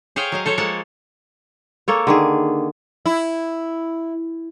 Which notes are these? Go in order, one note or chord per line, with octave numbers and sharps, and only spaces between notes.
G#4 C5 C#5 F5 G5
F#3 D#5 F5
A4 C5 C#5
F3 G#3 A#3 A4 F#5 A5
A#3 A4 C#5
D3 D#3 G#4
E4